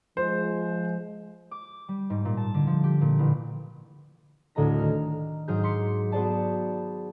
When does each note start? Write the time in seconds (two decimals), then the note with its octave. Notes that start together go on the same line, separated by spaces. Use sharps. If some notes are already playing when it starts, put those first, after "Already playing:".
0.17 F3 G#3 C5
1.51 D6
1.88 G3
2.10 G#2
2.25 A#2
2.37 A5
2.54 D3
2.67 F3
2.84 G4
3.01 A#2
3.19 A1
4.55 D2 A2 D3 D#5 A#5 A#6
4.79 D#3 F6
5.48 G#2 F#3 G#4 A#5 F6 G6
5.64 C6 D6 B6 C#7
6.12 B3 F#4 G#4 C5 D5 A5